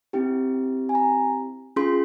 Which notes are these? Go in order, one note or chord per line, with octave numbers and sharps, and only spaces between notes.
C4 E4 G4 G5
G#5
A#5
C#4 F4 G#4 C6